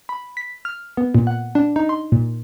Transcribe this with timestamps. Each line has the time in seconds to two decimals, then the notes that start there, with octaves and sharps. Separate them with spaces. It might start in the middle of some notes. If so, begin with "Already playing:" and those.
0.09 B5
0.37 B6
0.65 F6
0.97 B3
1.15 A#2
1.27 F#5
1.55 D4
1.76 D#4
1.89 C6
2.12 A#2